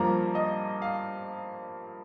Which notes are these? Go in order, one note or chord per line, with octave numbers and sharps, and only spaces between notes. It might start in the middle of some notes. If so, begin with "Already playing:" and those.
Already playing: G2 F3 A#3 A#5
D#5
F5